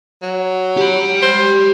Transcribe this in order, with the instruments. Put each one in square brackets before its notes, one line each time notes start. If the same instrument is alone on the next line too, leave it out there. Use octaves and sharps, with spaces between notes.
[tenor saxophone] F#3
[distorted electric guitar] G4 B5
[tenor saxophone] C5